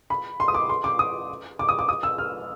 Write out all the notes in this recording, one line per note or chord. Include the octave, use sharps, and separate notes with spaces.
B5
C6
D#6
D6
C6
D6
D#6
D6
D#6
D6
D#6
E6
F6